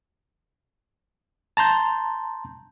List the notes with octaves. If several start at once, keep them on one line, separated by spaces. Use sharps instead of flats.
A5 A#5 C6 G6